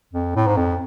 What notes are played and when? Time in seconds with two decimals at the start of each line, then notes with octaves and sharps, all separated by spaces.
0.13 F2
0.36 A2
0.47 G#2
0.57 F2